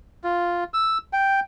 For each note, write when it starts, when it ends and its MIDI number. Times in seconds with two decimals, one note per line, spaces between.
0.24 0.64 65
0.74 0.98 88
1.13 1.40 79